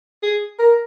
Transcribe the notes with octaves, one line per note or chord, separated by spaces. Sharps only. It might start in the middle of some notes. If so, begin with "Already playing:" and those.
G#4
A#4